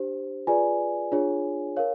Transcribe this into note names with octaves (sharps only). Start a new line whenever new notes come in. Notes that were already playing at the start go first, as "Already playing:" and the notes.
Already playing: D4 G4 C5
F4 G#4 B4 D5 G#5
D4 F4 G#4 C#5
A#4 C#5 F5